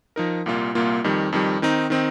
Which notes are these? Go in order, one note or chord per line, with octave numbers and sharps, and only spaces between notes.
F3 D#4 A#4
C2 A#2 A#3 F4
C2 A#2 A#3 F4
F2 D#3 G3
F2 D#3 G3
D#3 C4 D#4
D#3 C4 D#4